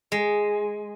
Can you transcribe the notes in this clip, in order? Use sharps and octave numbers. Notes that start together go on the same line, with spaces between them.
G#3